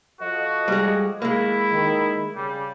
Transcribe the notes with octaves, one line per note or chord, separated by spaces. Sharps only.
F3 F#4 A4 D#5
G3 G#3
G#3 A#3 E4
D#3
C#3 G3